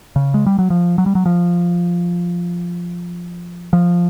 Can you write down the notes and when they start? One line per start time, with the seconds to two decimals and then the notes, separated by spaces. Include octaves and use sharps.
0.16 C#3
0.34 G#3
0.46 G3
0.59 F#3
0.70 F3
0.98 F#3
1.06 G3
1.15 F#3
1.26 F3
3.73 F3